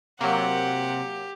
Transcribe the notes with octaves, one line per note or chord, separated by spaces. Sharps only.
C3 F#3 A#3 G4 F#5